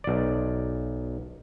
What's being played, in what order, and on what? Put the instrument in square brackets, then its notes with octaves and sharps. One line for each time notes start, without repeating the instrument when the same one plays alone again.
[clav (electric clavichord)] B1 D5